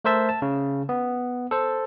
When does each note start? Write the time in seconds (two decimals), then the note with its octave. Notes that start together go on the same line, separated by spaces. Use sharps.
0.05 A3 A#4 C5 E5 A5
0.29 A5
0.42 C#3
0.89 B3
1.51 A4 C5